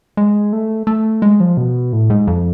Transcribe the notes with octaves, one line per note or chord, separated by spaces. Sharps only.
G#3
A3
A3
G#3
F3
B2
A2
G#2
F2